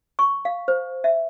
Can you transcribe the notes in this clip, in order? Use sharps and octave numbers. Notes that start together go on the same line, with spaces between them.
C#6
F5
C5
E5